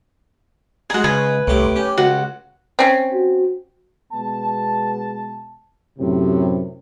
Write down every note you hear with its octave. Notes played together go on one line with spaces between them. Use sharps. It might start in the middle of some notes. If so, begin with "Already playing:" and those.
G#3 D#4 F#4 G#4
C#3 B4 G#5
C2 A2 G4
C#4 G4
C#2 F#4
C4 C#4
F#4
B2 G#3 B3 A5
F#2 A2 C3